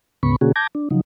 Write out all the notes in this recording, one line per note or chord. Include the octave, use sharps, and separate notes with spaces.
D2 G#2 C#3 B3 B5 C#6
B2 D3 A#3 C#4 F#4 G#4
A5 D6 G6 G#6 A#6
D4
C#3 F3 F#3 D#4